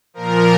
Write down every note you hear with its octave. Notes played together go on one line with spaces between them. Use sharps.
A#2 F3 A#4